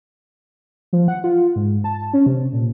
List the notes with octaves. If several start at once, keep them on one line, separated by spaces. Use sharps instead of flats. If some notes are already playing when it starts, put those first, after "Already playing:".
F3
F#5
F4
G#2
A5
C#4
C3
A#2